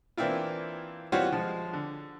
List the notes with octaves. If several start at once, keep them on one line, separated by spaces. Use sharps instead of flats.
E3 A#3 C4 D4 E4 F4
E3 G3 C4 F4 F#4 C#5
F3 G#3
D3